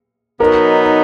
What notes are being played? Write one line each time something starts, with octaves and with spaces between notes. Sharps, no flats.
B2 F#3 B3 D#4 A#4